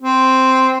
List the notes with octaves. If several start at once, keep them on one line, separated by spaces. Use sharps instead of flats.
C4